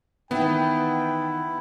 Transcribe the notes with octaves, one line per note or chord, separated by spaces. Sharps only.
D#3 E3 B3 E4 G5